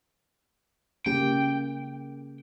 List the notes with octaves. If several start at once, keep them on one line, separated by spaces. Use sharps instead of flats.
C#3 A#3 G4 G5